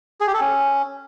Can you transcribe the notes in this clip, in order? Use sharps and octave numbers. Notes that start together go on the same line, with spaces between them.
G#4
G4
A4
C#4